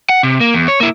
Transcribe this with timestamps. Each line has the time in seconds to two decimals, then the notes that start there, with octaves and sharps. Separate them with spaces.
0.09 F#5
0.23 C3
0.40 A#3
0.54 E2
0.68 C#5
0.80 A#3 E4